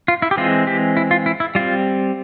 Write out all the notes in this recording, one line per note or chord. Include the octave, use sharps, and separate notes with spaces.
F4
E4
G4
E3 G#3 C4 F4
G4
E4
F4
E4
E4
G3 C4 F4